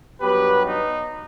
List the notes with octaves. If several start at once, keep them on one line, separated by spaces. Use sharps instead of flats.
G2 F#3 B3 G4 B4
D#4